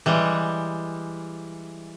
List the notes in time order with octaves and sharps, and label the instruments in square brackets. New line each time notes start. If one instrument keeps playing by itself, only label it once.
[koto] E3 G3 G#3